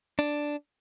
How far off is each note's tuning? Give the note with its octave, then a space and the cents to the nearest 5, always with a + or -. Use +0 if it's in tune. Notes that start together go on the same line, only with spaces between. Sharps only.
D4 +0